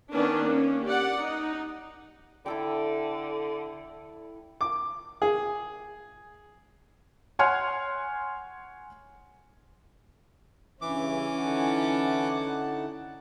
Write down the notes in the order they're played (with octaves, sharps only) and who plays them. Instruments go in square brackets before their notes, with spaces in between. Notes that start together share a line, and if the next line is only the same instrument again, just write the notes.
[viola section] D#3 B3 C#4 D4
A#3 C#4
G4 D5 F#5
D#4
[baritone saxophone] D3 [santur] E4 A4 G5
[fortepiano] D6
G#4
[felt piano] C#5 F#5 G#5 C6 F6
[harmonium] G2 C#3 E5 [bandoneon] E3 D6 [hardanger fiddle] C#4
[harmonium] D3 D#4 E4 [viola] F#5 A5